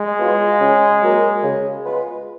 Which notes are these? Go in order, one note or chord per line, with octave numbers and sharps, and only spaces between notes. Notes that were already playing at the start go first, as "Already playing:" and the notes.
Already playing: G#3
F#3 B3 F4 G#4
C#3
F#3 A#3
C#3
G#3 B3 F4 B4